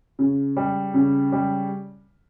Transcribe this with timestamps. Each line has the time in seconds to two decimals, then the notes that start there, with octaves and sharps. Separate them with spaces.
0.19 C#3
0.57 G3
0.94 C#3
1.32 G3